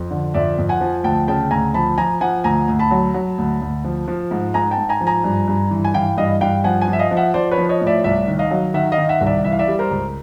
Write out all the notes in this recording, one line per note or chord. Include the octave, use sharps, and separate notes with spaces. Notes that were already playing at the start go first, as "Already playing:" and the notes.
Already playing: F2
D3
F2 D5 E5
F2
F#5 G#5
F3
D2 G5 A5
C#3 G5 A5
D2 G#5 A#5
F3 A5 B5
F3 G#5 A#5
F3 F#5 G#5
D2 G#5 A#5
D2
A5 B5
F#3
F#3
D2
D2
F3
F3
G#2
G#2 G#5 A#5
G5 A5
G#2
G#5 A#5
F3
G#5 A#5
G2
G2
E3
G#5
E3 F5 G5
G2 D#5 F5
G2 F5 G5
F3 F#5 G#5
F#5 G#5
F3
E5
D#5 F5
F3
E5 F#5
F3 C5 D5
B4 C#5
F3
C#5 D#5
A2
D5 E5
C2 D5 E5
D#3
D#5 F5
F#3
D#3 E5 F#5
D#5 F5
D#3
E5 F#5
C2
D5 E5
E3 E5
F5
D5 E5
G3
A#4 C5
C#2